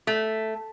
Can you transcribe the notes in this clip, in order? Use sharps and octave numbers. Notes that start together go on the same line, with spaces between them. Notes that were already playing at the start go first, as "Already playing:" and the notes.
A3